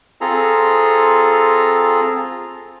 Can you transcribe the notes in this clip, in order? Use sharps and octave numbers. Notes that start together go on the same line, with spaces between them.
C4 F4 G#4 A4 A#5